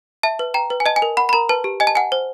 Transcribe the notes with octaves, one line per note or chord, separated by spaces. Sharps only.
E5 A5
B4
G5 A#5
B4
G#5
D#5 A5
G#5
A#4
F#5 B5
B5
A#4 A#5
B4 A5
G4
D#5 G#5
A5
F#5 G#5
C5